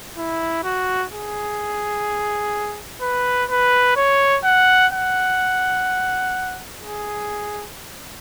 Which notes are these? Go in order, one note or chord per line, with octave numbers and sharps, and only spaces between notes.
E4
F#4
G#4
B4
B4
C#5
F#5
F#5
G#4